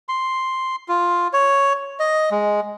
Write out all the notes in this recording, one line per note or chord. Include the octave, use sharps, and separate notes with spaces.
C6
F4
C#5
D#5
G#3